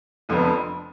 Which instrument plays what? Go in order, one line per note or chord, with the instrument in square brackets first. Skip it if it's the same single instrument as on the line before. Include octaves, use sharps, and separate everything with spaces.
[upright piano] F1 F2 D3 F3 B3